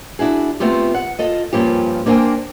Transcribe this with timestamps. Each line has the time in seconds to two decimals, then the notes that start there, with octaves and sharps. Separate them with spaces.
0.19 D4 E4 F#4 G#4
0.60 A3 B3 C4 F4 G4
0.94 F#5
1.19 F4 A4 D#5
1.53 G2 F3 A#3 C#4 F4 G4
2.06 A#3 D4 A#4 C5 G5 G#5